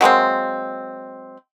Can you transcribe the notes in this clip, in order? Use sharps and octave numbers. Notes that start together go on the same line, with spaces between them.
F#3 G#3 A#3 C4